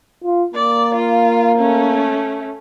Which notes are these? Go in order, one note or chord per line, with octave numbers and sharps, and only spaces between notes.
F4
A#3 D5
F4
A3 C#4